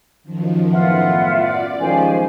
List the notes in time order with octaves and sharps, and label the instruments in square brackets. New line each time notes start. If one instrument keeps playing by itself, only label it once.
[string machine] F#2 D#3 F3
[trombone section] A2 B3 [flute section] F4 E5 F#5
[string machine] F#2 D5
[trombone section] C#2 D#3 F3 [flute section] G4 C5 G#5